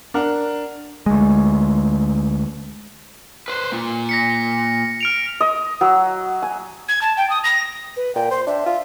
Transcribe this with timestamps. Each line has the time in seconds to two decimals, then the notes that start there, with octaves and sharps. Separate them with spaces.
0.14 D4 A#4 F#5
1.06 D2 G#3
3.48 B4 C5
3.72 A#3 F4
4.09 A#6 B6 C#7
5.01 F6 D7 F7
5.41 D#5
5.81 F#3
6.43 G#5
6.88 G#6
7.01 A5
7.17 G5
7.29 D#6
7.44 A#6
7.97 B4
8.15 A#2 G5
8.31 C5 C6
8.47 D4 E5
8.66 F4